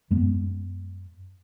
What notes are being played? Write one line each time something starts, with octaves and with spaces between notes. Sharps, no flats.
F#2 G#3 B3